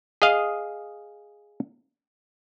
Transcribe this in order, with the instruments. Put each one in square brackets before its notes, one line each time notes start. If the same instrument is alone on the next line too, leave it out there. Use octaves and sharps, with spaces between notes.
[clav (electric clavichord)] G#4 D#5 F5